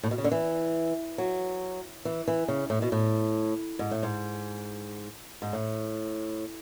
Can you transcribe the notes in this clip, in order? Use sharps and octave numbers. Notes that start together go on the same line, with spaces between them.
A2
B2
C#3
D3
E3
F#3
E3
E3
C#3
A2
B2
A2
G#2
A2
G#2
G#2
A2